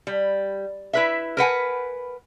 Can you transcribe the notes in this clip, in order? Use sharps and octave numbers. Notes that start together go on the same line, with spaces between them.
G3
E4 B4 E5
A#4 B4 F#5 G#5